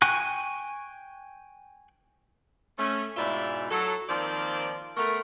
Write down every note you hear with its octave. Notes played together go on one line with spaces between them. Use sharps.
G5 G#5 C#6 F#6
A3 C#4
G#2 B2 E4 F4 D5 E5
F#3 A4
D#3 F3 A#3 C4 D5
A3 B3 A#4